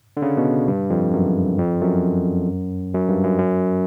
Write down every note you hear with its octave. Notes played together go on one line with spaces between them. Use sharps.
D3
C#3
B2
G2
F2
F#2
F2
F#2
F#2
G2
F#2
F#2